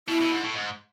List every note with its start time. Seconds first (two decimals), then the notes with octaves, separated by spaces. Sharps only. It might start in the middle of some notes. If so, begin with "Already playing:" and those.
0.08 B2 E4
0.21 B2
0.31 G#2
0.43 A2
0.55 G#2